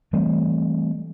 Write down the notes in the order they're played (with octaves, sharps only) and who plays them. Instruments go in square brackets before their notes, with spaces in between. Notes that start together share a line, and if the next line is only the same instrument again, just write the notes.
[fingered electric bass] E3 G3 A3 C4